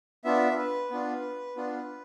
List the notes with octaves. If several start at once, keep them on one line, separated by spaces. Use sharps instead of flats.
B3 D4 F4 E5
B4
B3 D4 F4
B3 D4 F4